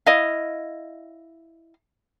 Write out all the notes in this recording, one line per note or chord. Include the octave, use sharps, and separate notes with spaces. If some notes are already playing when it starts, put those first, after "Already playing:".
E4 D#5 F5